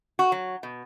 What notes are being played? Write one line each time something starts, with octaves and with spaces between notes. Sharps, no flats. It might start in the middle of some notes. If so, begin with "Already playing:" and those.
F#4
F#3
B2